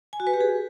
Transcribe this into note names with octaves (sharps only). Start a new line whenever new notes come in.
G#5
F#4
B4
G4
G#4